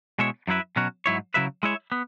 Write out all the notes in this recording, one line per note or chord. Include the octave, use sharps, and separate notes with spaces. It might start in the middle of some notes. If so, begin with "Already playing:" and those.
B2 G#3 E4 C#5 E5
F#2 F#3 E4 B4 E5
B2 F#3 C#4 F#4
G#2 F#3 E4 C#5
C#3 F#3 E4 B4 E5
G#3 E4 C#5 E5
B3